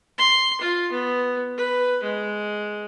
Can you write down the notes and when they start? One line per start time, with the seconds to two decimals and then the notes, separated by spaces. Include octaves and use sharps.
0.18 C6
0.61 F4
0.92 B3
1.58 B4
2.03 G#3